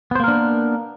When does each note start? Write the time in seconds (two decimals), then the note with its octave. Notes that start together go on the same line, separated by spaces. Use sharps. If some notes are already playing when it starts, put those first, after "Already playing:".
0.11 B3
0.15 C5
0.20 A#3
0.24 A#4
0.28 D4